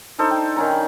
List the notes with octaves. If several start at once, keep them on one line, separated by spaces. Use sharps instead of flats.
D4 D#4 A4 C5
G5
D#3 C#4 A#5
B5